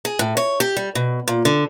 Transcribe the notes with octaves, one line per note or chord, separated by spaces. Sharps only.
G#4
A2
C#5
G4
G3
B2
A#2
D3